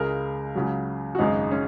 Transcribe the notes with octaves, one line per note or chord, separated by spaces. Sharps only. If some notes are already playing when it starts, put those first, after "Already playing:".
Already playing: C#2 C#3 G#3 A#4
C#2 C#3 F#3
F#4
G#1 F#2 C#3 G#3 D#4
C#4